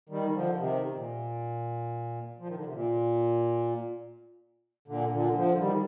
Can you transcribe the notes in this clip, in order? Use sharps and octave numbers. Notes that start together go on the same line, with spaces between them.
D#3 G3
D3 F3
C3 D#3
A#2
F3
D#3
D3
C3
A#2
A#2 D3
A#2 D3
D3 F3
D#3 G3